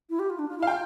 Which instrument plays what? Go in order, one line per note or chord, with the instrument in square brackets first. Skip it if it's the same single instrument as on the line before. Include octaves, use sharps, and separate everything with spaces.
[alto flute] E4
G4
F4
D4
F4
[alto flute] E4 [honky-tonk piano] F5
[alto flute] F4 [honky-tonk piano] G5